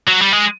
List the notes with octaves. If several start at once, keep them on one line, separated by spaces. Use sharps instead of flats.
F#3
G3
G#3